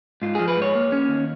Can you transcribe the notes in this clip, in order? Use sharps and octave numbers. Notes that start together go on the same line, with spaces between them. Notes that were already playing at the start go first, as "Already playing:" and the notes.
G#2 F4
F3 G#4
B4
G#2
C#5
A#3
C#4
D#2